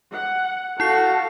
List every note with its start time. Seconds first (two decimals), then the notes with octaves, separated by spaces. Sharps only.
0.11 F#5
0.80 E4 F#4 A4 F5 A5 C7